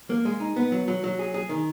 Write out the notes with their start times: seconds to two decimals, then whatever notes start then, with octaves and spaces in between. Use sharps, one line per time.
0.10 A#3
0.25 G#3
0.40 D#4
0.56 B3
0.72 F#3
0.88 F#3
1.04 F#3
1.19 G#4
1.34 G#4
1.49 D#3